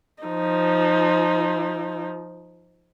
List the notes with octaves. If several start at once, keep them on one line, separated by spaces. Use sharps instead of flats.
F3 D#4